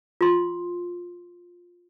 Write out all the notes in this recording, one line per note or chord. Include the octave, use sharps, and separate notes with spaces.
F4 C6